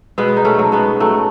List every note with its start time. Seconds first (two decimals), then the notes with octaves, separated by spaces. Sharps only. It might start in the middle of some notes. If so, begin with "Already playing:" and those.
0.18 B2 G#3 B3
0.37 D#4
0.45 A3 C#4
0.59 F#3
0.72 G#3 B3
1.00 F#3 A3